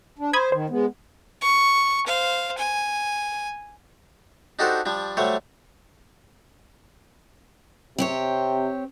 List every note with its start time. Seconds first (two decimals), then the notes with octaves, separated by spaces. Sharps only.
0.19 D4
0.33 C5 B5 D#6 G#6
0.52 D#3 C5
0.70 G#3 B3
1.41 C#6
2.06 C5 F5
2.57 G#5
4.59 D4 D#4 F#4 G4 A4 C5
4.86 F3 G3 D4
5.17 F#3 G3 A3 C5 C#5
7.98 C3 C4 G4 C#5